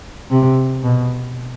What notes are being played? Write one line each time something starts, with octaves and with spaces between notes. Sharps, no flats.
C3
B2